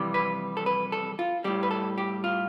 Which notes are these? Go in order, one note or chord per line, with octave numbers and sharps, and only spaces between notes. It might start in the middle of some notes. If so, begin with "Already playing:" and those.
Already playing: F2 C3 E3 G3
B4
A4
B4
A4
F4
A2 G3 G4
B4
A4
G4
F4